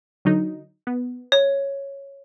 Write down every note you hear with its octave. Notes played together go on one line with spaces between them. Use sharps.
D3 F#3 D#4
B3
C#5